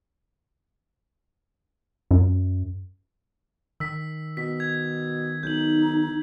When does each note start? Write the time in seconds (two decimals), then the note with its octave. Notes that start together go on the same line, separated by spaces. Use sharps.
2.11 F#2
3.80 D#3 E6 B6
4.37 B2 B6
4.60 G#6
5.43 B1 D#4 G6 F#7